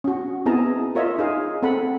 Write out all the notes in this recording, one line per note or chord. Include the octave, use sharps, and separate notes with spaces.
C#4 F#4
B3 C4 E4 G#4 A5 A#5
F4 A#4 C#5 D#5 E5
D#4 G#4 F5
C4 A4 F#5 B5